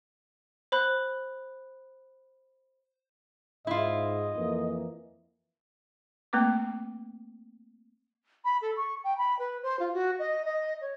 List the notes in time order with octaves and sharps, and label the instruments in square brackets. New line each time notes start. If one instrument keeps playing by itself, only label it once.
[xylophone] C5 B5 F#6
[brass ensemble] G#2 [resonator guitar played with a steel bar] E4 F4 [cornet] D#5
[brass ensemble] F2 E3 A#3
[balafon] A3 A#3 C4 B4 D6
[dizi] B5
A4
C#6
G5
B5
B4
C5
F4
F#4
D#5
D#5
C#5